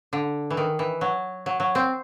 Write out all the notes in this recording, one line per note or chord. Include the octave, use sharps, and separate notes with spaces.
D3
E3
D#3
E3
F#3
F#3
F#3
C4